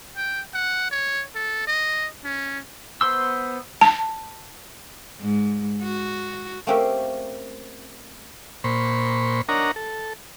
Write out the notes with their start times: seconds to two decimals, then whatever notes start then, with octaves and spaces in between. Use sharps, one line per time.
0.17 G5
0.54 F#5
0.91 C#5
1.35 A4
1.67 D#5
2.25 C#4
3.01 B3 C5 C6 E6
3.81 A5
5.20 G#2
5.83 F#4
6.67 A3 A#3 C4 C#4 G4 A#4
8.64 A#2 C5 B5 C#6
9.49 D4 A#4 C#5 D#5 F#5 A#5
9.76 A4